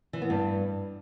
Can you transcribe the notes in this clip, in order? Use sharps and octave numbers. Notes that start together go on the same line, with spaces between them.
E3
B3
G2